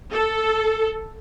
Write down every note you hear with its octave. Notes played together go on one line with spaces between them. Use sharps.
A4